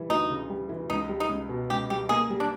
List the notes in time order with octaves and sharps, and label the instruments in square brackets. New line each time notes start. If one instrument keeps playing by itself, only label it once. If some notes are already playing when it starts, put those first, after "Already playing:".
Already playing: [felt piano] E3 G3
[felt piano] D2 [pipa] D#4
[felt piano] C#3
G3
E3
[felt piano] C#2 [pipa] D#4
[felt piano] G3
[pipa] D#4
[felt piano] C#2
B2
[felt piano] C#2 [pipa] G4
[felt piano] G3 [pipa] G4
[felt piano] A#3 [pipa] G#4
[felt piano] G3
[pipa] D4